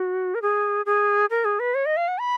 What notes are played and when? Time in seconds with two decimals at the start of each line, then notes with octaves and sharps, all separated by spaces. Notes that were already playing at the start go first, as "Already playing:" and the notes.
Already playing: F#4
0.35 A#4
0.42 G#4
0.86 G#4
1.30 A#4
1.45 G#4
1.59 B4
1.74 C#5
1.86 D#5
1.97 F5
2.08 F#5
2.19 B5